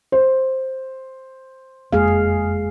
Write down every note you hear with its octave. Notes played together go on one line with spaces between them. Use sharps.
C5
F#1 F2 G#3 A#3 G#4 F5